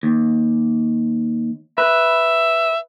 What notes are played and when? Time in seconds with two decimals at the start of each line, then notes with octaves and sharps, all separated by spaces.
0.03 D#2
1.78 B4 E5